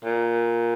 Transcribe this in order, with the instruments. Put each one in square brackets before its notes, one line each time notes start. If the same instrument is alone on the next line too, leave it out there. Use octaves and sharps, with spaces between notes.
[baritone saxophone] A#2